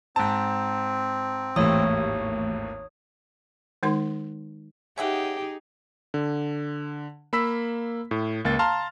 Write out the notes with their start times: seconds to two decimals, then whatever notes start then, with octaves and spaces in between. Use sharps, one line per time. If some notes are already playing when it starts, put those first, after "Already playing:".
0.16 G#2 C4 A5
1.56 G#1 D#2 A2 E3 A3 G4 C#5 D#6
3.83 D#3 G#3 D#4 A#4 C6
4.98 C#4 D#4 G4 G#4 E5 F#5
6.14 D3
7.33 A#3 B5 E6 B6
8.11 A2
8.45 C#2 A#3 A6
8.59 F5 A5 A#5 C6 F6